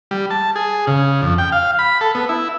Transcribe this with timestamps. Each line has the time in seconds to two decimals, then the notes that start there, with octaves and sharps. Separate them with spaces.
0.11 G3
0.31 A5
0.56 G#4
0.87 C#3
1.22 F2
1.38 G5
1.52 F5
1.79 B5
2.01 A4
2.15 B3
2.29 E4